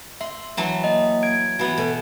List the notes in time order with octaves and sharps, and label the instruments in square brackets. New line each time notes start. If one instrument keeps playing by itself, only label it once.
[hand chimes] E5 [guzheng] C6
[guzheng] E3 F#3 A5
[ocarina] A#3 [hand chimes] D#5
[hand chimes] G#6 D7
[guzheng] E3 B3 [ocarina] F#4
[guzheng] B2 [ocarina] A4